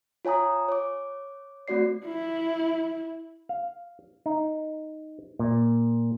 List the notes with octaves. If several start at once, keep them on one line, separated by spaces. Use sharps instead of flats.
F4 C#5 G#5 A#5 D#6
C#5 D6
A3 C4 F#4 D5 C7
E4
F5
D#4
A#2